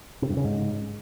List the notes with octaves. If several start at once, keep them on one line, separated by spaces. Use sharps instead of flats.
C3
G2
C#3
G#2